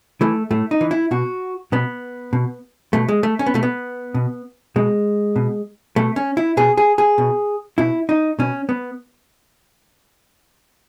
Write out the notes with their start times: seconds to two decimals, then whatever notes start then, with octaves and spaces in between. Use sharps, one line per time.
0.21 E3 A3
0.51 A2 A3
0.71 D#4
0.81 E3
0.91 E4
1.11 B2 F#4
1.72 B2 B3
2.33 B2
2.93 B2 A3
3.08 G#3
3.23 A3
3.39 C#4
3.46 B3
3.54 B2 A3
3.63 B3
4.14 B2
4.76 B2 G#3
5.36 B2
5.96 B2 A3
6.16 C#4
6.37 E4
6.57 B2 G#4
6.77 G#4
6.98 G#4
7.18 B2
7.78 B2 E4
8.09 D#4
8.39 B2 C#4
8.69 B3